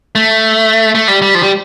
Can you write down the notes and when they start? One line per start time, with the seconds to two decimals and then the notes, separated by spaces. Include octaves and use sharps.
0.15 A3
0.95 A3
1.08 G3
1.22 G3
1.35 F3
1.43 G3